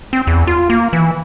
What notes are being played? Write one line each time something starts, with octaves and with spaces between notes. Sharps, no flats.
C4
E2
F4
A#3
E3